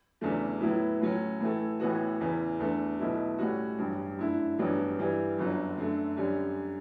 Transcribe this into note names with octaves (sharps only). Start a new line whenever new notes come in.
E2 C#3 F#3 A3 D4
A2 F#3 B3 E4
A2 F#3 C#4
A2 E3 A3
A1 A2 E3 B3 F#4
E2 C#3 E3
E2 D3 A3
B1 B2 A3 E4
A2 G3 C#4 F#4
A1 G2 F#3
F#2 D3 A3 E4
A1 G2 F#3 B3 D4
G2 E3 G3
G1 F#2 D3 F#3
F#2 D3 A3
F#2 D3 G3 C#4